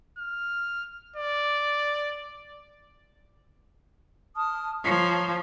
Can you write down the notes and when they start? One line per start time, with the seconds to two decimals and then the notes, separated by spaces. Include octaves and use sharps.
0.19 F6
1.16 D5
4.36 A5 D#6 F6
4.84 F3 C#5 A#5 C#6